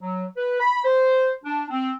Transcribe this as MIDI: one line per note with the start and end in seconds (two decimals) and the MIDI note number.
0.02 0.24 54
0.37 0.59 71
0.60 0.80 83
0.85 1.32 72
1.44 1.65 62
1.70 1.92 60